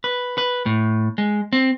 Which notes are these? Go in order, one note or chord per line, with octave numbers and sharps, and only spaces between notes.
B4
B4
A2
G#3
C4